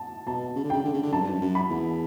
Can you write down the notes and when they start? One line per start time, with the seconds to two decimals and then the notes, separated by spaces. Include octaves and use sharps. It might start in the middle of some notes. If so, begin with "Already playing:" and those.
Already playing: A5
0.27 B2 A5
0.56 C#3
0.64 D3
0.70 C#3 G5
0.85 D3
0.93 C#3
1.03 D3
1.13 F#2 A5
1.21 G2
1.30 F#2
1.42 F#2
1.55 B5
1.70 E2